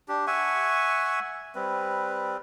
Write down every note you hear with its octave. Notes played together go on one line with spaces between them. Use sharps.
D4 G4
E5 F#5 G#5 C#6
G3 C4 B4